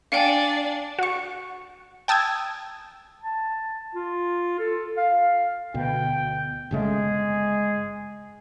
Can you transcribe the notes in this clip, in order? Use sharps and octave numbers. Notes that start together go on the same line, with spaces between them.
D4 F5 G5 G#5
F#4 C#6
G5 A5 D#6 E6 G#6
A5
F4
A4
F5
D2 B2 G5
G1 C#3 G#3 A3 G#4